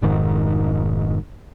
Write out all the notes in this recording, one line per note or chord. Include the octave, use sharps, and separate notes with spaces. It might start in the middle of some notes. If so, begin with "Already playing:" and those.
F1 G#2 D#3